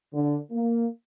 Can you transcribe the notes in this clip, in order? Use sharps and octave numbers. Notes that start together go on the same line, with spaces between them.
D3
A#3